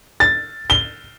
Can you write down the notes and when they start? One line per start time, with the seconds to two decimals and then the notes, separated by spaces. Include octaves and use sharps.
0.20 A6
0.70 G7